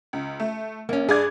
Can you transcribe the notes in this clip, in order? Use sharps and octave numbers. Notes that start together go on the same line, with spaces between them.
C#2
A3
A#1 A#3 C#4
G2 G#4 D5 G#6